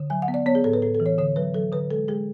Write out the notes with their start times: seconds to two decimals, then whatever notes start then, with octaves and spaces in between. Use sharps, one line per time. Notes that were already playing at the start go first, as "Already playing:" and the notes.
Already playing: D3
0.10 F#3 G#5
0.22 F#5
0.28 B3
0.34 D5
0.46 B3 C#5
0.55 G#4
0.64 A2 A4
0.73 B4
0.82 A2 A4
0.95 A4
1.00 E3
1.06 C#5
1.18 D3 C#5
1.36 F#3 B4
1.54 F#3 A4
1.72 D3 B4
1.91 G#3 A4
2.08 G#3 G#4